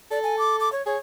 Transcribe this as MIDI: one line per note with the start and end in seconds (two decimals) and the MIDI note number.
0.11 0.69 69
0.11 0.19 74
0.23 0.38 80
0.38 0.56 86
0.60 0.71 86
0.72 0.84 73
0.86 0.96 68
0.86 0.98 73